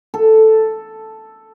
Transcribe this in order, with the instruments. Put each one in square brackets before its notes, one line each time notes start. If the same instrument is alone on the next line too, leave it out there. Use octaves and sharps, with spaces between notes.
[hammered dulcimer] A4